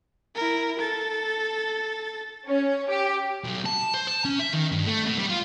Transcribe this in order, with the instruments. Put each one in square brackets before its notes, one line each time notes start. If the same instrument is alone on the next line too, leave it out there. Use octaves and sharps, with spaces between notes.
[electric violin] E4 A#4
A4 A6
[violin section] C#4
G4
[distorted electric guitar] B1
A5
C5
A5
C#4
E5
D#3
G2
A3
B2
G3
F4